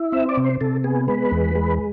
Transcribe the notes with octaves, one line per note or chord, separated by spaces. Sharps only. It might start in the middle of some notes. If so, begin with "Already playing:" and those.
Already playing: E4
C4 E5
D5
C3
C5
C3 A4
B3 G#4
G#3 B4
E2
G#3